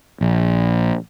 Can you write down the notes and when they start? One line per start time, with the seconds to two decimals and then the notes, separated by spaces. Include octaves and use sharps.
0.21 A#1